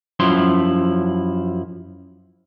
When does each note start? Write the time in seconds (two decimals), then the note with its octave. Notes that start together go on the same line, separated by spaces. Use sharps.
0.20 F#2 F3 E4 C6